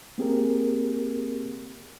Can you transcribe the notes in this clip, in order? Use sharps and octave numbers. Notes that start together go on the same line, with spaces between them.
A#3 C4 G4 G#4 A#4